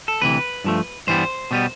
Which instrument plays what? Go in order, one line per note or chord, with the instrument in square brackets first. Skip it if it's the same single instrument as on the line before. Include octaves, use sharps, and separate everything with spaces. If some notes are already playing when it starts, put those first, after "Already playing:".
[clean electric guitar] A4
D2 C3 E3 B4
G2 F3 A3
G2 E3 G3 B3 C5
B2 G3 B3